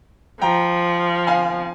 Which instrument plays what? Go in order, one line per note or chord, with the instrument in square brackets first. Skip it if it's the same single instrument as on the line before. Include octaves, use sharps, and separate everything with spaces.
[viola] F3 [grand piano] G5 A#5
[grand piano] F5 G#5